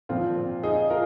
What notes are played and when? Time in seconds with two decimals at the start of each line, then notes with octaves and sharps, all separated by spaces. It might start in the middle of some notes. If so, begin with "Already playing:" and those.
0.09 A#2 F3 C4 F4
0.63 D#4 G#4
0.90 F4 A#4